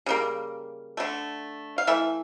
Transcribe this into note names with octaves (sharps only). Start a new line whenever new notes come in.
C#3 G3 A#3
D3 A3
F5
E3 A3 E5